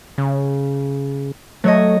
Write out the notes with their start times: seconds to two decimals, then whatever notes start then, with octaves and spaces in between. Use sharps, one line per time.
0.18 C#3
1.64 F#3 A3 C#5 D#5